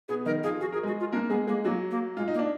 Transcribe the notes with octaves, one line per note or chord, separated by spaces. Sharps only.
B2 B3 G#4
D#3 D#4 A#4
F3 F4 G#4
F#4 G#4
G#4 A#4
G#3 F#4 G#4
F4
A#3 D4 A#4
G#3 B3 G#4
G#3 A#3 G#4
F#3 A#3 F#4
A#3
G#3 F4
D#4
A#3
D4